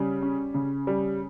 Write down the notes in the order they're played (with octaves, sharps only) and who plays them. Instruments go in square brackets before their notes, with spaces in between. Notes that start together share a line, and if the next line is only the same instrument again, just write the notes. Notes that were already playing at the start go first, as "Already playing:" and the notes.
Already playing: [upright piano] C#3 G3
C#4
C#3
G3